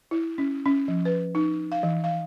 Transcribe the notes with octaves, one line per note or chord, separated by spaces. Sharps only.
E4
C#4
C#4
F3
B4
D#4
F5
E3
F5